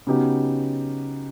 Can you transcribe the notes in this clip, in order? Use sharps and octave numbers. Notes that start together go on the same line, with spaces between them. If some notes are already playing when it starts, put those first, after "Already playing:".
C#3 F#3 B3 D#4 G4